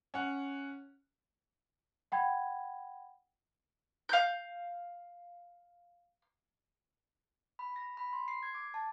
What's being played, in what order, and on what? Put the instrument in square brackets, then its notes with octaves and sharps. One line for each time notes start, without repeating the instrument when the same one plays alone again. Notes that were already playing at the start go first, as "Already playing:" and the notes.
[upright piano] C#4 F#5
[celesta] F#5 G5 B5 G#6
[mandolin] F5 G6
[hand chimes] B5
A#6
B5
C6
C7
G#6
D6
A5